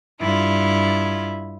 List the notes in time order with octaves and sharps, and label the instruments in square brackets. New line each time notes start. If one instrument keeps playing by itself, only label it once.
[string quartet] G2 E4 F4